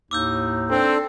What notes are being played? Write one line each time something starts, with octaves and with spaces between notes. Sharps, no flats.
D#2 A2 D#4 D6 E6 G6
C4 D4 A4 C5